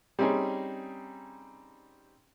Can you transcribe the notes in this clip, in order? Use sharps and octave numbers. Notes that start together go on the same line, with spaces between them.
G3 C4 C#4 D#4 G#4